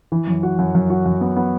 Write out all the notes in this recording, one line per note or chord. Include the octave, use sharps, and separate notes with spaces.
E3
F#2
F#4
F#2
F#2
F#4
F#2
B3
B3